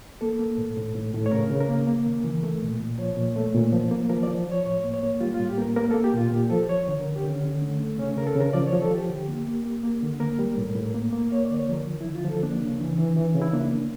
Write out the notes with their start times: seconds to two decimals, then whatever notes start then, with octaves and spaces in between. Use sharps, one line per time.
0.21 A#3 A4
0.39 A#3
0.58 A2
0.77 A2
0.95 A2
1.14 A2
1.26 C#5
1.32 C#3 A#4
1.50 C#3
1.61 A#4
1.69 A#3
1.87 A#3
2.06 C#3
2.24 E3
2.43 A3
2.62 A#2
2.80 A#2
2.98 F3 C#5
3.17 A#2
3.36 A3
3.55 A#2
3.72 F3
3.91 A#3
4.09 F3 A#4
4.23 F3 D5
4.47 F3 C#5
4.65 A2 C#5
4.84 A#3
4.94 C#5
5.03 A#3
5.21 G3 F4
5.34 F4
5.39 A2
5.49 G4
5.58 A#3 A#4
5.76 A#3 A#4
5.91 A#3 A4
6.04 G4
6.14 A#2 F4
6.31 A#2 G4
6.50 F3 A4
6.69 F3 C#5
6.88 D3 C#5
7.01 A#4
7.06 D3
7.16 G4
7.24 D3 C#4
7.43 D3
7.61 A3
7.80 A3
7.98 C#3 C#4
8.16 C#3 A#4
8.27 A4
8.36 C#3 A#4
8.53 F3 D5
8.67 C#5
8.73 F3
8.82 A4
8.91 F3 G4
9.09 D3 G4
9.28 A#3
9.47 A#3
9.66 A#3
9.83 A#3
10.02 D3
10.20 A#3 A#4
10.39 G3
10.58 A2
10.75 A2
10.95 A#3
11.13 A#3
11.32 A#3 C#5
11.45 D5
11.50 D3
11.59 C#5
11.69 F3 A#4
11.87 F3
12.00 E4
12.05 D3
12.15 F4
12.25 F3 A4
12.43 A#3 D4
12.62 C#3
12.80 E3
12.98 E3
13.16 E3
13.34 C#3
13.42 E4
13.53 A#3 D4
13.72 A#3